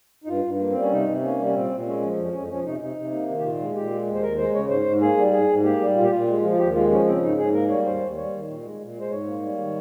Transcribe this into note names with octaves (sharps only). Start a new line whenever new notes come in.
D#4
G2 F4
G2
A#3
G3 C4
C#4
C3 D#4
C3
A#3 C#4
G3
C#4
A#2 C4
A#2
G#3 C#4
F3
F2
F2 C#4
F3 C#4
C3 D#4
C3 D#4
C3
A#3
D#3
G4
A#2 F4
G#3
A#2 G4
G#3
D#2
C5
D#2 A#4
G#3 C5
C#3 C#5
G#2 C5
G#2
A#3 G#4
G3
G#2 G#4
G#2
A#3 G4
G3
A#2 F4
G4
A#2 F4
G#3
F3
F4
D#2 G4
G#3 F4
F3 C#4
C#3 C4
G#2 D#4
G#2 G#4
A#3 A#4
G3 C#5
D#2 C5
D#2
G3 C#5
D#3
A#2
G#3
A#2
G#3
C5
G#2 C#5
A#3
G3
D#3